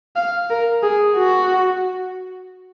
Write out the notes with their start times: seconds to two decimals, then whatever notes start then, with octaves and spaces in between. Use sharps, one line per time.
0.16 F5
0.50 A#4
0.83 G#4
1.17 F#4